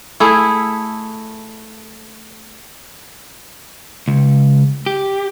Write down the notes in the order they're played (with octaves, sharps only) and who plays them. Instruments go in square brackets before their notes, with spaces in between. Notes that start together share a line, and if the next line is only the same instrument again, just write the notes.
[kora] A3 E4 G#4
[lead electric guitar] C#2
G4